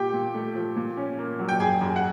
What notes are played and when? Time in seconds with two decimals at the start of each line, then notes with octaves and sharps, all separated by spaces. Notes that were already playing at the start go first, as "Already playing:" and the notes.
Already playing: A#2 G4 G5
0.13 A#2
0.34 A3
0.55 F3
0.76 A#2
0.97 C#4
1.19 A#3
1.39 F#3
1.49 G5
1.60 F#2 G#4 G#5
1.81 F#2
1.96 F#5